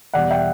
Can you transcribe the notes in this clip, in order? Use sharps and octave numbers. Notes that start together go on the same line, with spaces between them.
E2 B2 G3 D5 F#5
E5 G5